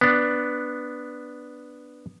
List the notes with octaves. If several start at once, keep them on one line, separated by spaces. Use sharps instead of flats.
B3 D4